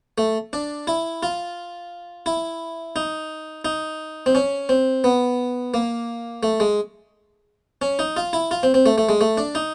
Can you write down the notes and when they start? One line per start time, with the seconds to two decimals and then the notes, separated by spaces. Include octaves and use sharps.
0.18 A3
0.53 D4
0.87 E4
1.23 F4
2.26 E4
2.96 D#4
3.65 D#4
4.26 C4
4.35 C#4
4.69 C4
5.04 B3
5.74 A#3
6.43 A3
6.60 G#3
7.82 C#4
7.99 D#4
8.17 F4
8.33 E4
8.51 F4
8.63 C4
8.74 C4
8.86 A3
8.98 A3
9.09 G#3
9.21 A3
9.38 D4
9.55 D#4